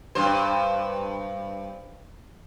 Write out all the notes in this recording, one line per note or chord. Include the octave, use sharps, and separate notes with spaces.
G2 C5